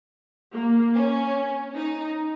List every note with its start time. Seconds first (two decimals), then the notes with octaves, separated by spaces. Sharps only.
0.53 A#3
0.95 C#4
1.77 D#4